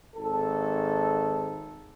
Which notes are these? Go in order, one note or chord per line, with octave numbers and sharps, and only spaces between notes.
G#1 A4